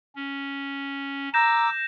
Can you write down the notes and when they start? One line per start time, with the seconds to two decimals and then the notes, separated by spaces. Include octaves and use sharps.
0.15 C#4
1.34 A#5 D6 E6 G6 A#6 E7